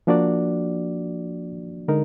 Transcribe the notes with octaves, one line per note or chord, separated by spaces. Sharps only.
F3 A#3 D4 F#4 D5
D3 G#3 D#4 A#4